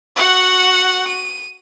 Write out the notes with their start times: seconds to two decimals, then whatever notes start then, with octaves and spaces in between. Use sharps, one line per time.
0.16 F#4 F#5
1.07 D#7